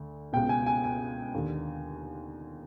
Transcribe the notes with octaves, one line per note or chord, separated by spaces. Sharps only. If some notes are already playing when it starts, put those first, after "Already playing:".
Already playing: D2 D3
C#2 B2 G5
G#5
G#5
G#5
D#2 D3